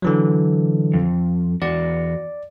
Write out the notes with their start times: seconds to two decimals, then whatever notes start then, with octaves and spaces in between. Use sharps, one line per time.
0.02 D3 E3 F#3
0.93 F2
1.62 E2 F#4 D5